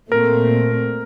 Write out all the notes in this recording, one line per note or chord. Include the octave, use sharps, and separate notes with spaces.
A#2 A3 C4 A#4